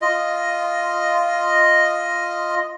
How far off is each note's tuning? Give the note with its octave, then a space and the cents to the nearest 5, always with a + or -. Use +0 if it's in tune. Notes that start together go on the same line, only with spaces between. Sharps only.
F4 -5 D#5 +0